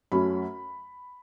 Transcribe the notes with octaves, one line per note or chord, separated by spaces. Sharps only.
F#2 F#3 A3 C#4 B5